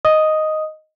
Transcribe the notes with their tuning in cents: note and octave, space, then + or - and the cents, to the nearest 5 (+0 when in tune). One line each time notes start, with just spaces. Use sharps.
D#5 +0 D#6 +0